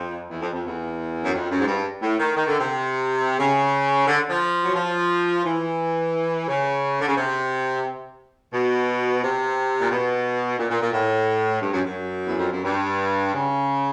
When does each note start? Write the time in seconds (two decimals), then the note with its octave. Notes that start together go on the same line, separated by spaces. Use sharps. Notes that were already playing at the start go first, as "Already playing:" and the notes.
Already playing: F2
0.29 E2
0.41 F2
0.52 F2
0.64 E2
1.22 F#2
1.32 F2
1.50 F#2
1.59 G#2
1.66 G2
2.01 A2
2.18 D#3
2.36 D#3
2.47 D3
2.59 C3
3.38 C#3
4.07 D3
4.29 F3
4.64 F#3
4.75 F3
5.44 E3
6.47 C#3
7.00 D3
7.07 C#3
7.16 C3
8.52 B2
9.22 C3
9.79 A#2
9.90 B2
10.58 A#2
10.69 A#2
10.81 A#2
10.92 A2
11.60 G2
11.73 F#2
11.84 F#2
12.24 E2
12.38 F2
12.51 F#2
12.64 G2
13.33 C#3